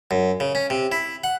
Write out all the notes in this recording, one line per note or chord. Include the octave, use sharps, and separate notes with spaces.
F#2
C#3
C#4
C3
E4
F#5